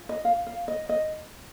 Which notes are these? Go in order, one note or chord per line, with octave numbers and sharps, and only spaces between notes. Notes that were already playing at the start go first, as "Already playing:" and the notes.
Already playing: F4
D#5
F5
F5
D#5
D#5